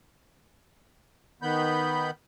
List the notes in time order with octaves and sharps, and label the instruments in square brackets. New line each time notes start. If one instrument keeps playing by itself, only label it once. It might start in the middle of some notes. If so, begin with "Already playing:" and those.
[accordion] D#3 B3 B5 G6